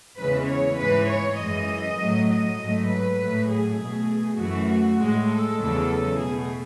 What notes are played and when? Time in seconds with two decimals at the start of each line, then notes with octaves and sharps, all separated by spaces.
0.18 E2 C#3 E3 G#3 B4
0.48 C#5
0.79 G#2 E3 G#3 B4
1.08 C#5
1.38 F#2 E3 G#3 D#5
1.99 A2 F#3 A3
2.29 D#5
2.58 G#2 F#3 A3
2.88 B4
3.19 A2 F#3 A3
3.48 G#4
3.78 B2 A3
4.38 F#2 E3 A3 F#4
4.68 F#4
4.98 A2 G#3
5.29 A4
5.59 E2 C#3 F#3
6.18 B2 A3 G#4